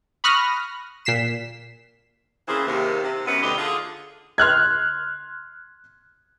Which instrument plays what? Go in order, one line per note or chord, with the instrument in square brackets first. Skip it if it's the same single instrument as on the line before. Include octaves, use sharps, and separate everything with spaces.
[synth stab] B5 C#6 D#6 F6 F#6 A#6
A#2 B6 C7 E7
[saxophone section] C#3 E3 A#3 C4 G#4 C5
D#2 C3 D#3
C3
F#2 B3
D2 B2 D3 D#4 G4
D3 F4 G#4
[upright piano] C6 F6 F#6 G#6